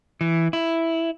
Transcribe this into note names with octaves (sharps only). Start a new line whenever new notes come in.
E3
E4